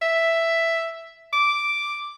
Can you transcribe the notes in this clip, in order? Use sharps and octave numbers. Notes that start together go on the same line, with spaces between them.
E5
D6